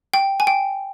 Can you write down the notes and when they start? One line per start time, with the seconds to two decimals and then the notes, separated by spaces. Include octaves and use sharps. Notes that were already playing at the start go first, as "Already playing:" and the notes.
0.14 G5
0.40 G#5
0.47 G5